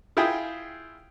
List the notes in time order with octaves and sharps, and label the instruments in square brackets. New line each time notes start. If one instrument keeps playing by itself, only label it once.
[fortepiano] E4 F4 G#4 E5 G5 D#6